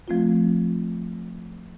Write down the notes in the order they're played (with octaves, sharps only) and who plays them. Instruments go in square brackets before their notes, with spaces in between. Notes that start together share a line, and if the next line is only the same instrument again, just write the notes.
[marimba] F3 A3 C4 F4